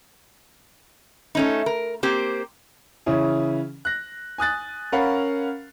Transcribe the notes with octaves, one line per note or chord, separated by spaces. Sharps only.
A3 C#4 D#4
A#4
A#3 C4 G4
C#3 E3 C#4 E4
F#6 A#6
G#5 D#6 F#6 A6
C#4 A#4 F5 F#5 B5